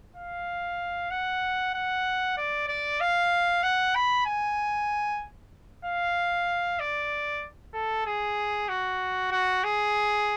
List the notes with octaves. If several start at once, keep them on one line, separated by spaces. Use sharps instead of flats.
F5
F#5
F#5
D5
D5
F5
F#5
B5
G#5
F5
D5
A4
G#4
F#4
F#4
G#4